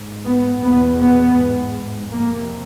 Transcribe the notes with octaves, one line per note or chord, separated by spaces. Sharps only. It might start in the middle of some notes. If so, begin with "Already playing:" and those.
Already playing: G#2
B3
E2 B2 B3
B3
G#2
F2 C3 A#3